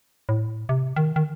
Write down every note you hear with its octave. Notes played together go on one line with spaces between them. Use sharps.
A2
C3
D#3
D#3